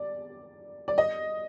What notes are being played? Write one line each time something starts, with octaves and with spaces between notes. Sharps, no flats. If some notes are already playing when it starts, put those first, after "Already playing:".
Already playing: D5
D5
D#5